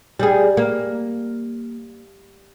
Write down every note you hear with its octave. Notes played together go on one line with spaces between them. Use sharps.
G3 G#4
A#3